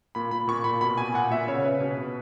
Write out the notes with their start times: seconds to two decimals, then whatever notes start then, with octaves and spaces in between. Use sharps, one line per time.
0.15 A#2 B5
0.31 A#2 B5
0.48 A#2 C#6
0.64 A#2 B5
0.81 B2 B5
0.97 B2 G#5
1.14 A#2 F#5
1.30 A#2 E5
1.47 C#3 C#5
1.64 C#3 B4
1.80 B2
1.97 B2